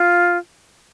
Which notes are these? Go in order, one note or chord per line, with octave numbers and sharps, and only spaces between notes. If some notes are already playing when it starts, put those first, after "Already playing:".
Already playing: F4